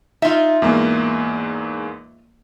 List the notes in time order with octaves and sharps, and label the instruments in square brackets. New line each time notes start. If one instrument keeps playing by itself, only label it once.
[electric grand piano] D#4 [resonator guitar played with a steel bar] F4 E5
[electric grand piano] E2 G#2 A#3